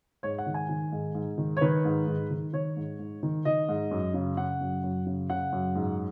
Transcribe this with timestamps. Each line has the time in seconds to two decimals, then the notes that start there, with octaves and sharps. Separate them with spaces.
0.23 G#2 C#5
0.38 F#5
0.46 D#3
0.54 G#5
0.69 D#3
0.92 G#2
1.15 G#2
1.38 D#3
1.57 C#5
1.61 D#3 B4
1.85 G#2
2.07 G#2
2.30 D#3
2.53 D#3 C#5
2.76 G#2
2.99 G#2
3.23 D#3
3.45 D#3 D#5
3.69 G#2
3.91 F#2
4.14 C#3
4.37 C#3 F#5
4.61 F#2
4.83 F#2
5.06 C#3
5.30 C#3 F#5
5.52 F#2
5.75 G#2